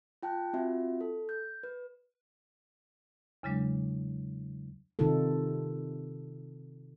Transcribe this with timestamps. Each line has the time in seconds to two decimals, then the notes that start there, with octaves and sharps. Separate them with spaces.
0.23 F4 G5 A5 F#6
0.53 C4 F4 F#4 E5
1.01 A4
1.29 G6
1.63 B4
3.43 E2 C#3 F#3 G#3 D4
4.99 C3 D#3 D#4 F4 A4